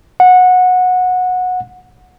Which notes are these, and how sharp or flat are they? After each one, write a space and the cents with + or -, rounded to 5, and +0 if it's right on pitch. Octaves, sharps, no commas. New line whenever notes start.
F#5 -20